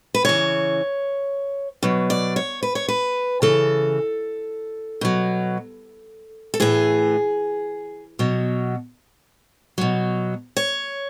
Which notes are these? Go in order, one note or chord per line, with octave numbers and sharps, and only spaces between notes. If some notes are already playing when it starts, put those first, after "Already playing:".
B4
C#3 E3 C#5
B2 F#3
D5
C#5
B4
C#5
B4
C#3 E3 A4
B2 F#3
A4
A2 E3 G#4
B2 F#3
B2 F#3
C#5